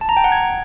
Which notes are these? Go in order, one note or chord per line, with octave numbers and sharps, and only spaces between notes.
A5
A#5
G5
F#5
G#6